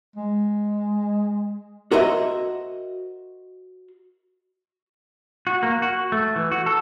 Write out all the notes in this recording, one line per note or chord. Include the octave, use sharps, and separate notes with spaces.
G#3
F#4 A#4 C5 D#5 E5
F#4
A#3
F#4
A3
E3
F#4
A4